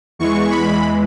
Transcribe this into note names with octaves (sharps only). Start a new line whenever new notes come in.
E2 E3 G#3 C#6
B5